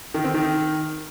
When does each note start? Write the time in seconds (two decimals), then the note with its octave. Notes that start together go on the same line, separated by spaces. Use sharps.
0.14 D#3
0.24 C4
0.34 D#3